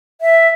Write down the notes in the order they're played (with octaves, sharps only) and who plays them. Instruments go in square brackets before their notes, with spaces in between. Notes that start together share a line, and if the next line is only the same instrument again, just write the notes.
[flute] E5